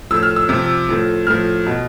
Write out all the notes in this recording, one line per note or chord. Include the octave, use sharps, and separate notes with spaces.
A2 F3 E6
F6
E6
C3 F3
A2 F3
A2 F3 F6
B2